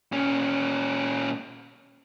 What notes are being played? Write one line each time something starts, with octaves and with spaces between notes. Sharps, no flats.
A#2 C#4